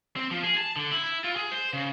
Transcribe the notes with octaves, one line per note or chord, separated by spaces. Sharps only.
C4
F3
G#4
A5
D3
E4
E4
F4
G#4
C5
C#3